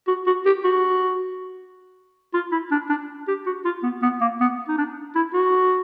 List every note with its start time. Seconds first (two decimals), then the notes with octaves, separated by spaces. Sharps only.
0.08 F#4
0.27 F#4
0.46 G4
0.64 F#4
2.34 F4
2.52 E4
2.71 D4
2.89 D4
3.28 G4
3.46 F#4
3.65 F4
3.83 B3
4.02 B3
4.21 A#3
4.41 B3
4.68 D#4
4.78 D4
5.15 E4
5.34 F#4